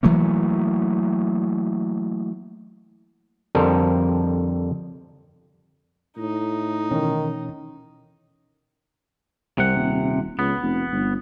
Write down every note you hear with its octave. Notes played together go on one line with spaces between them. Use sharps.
E3 F#3 A3 A#3
F2 D3 G3 A4 A#4 C5
A2 D#4
B2 D#3 E3 C#4
C2 C3 F#5
D#1
C#2 B3
F1
G1